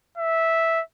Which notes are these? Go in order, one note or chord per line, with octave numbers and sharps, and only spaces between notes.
E5